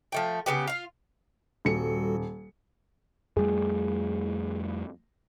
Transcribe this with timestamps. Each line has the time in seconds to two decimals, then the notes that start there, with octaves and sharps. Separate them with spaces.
0.12 F3 A3 G5
0.46 C#3 F3 B3 G4
0.67 F4 F5
1.65 D#1 G3 F#4 A4 C#7
3.37 F2 G3 A3 G#4